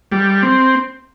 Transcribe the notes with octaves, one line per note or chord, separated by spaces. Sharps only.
G3
C4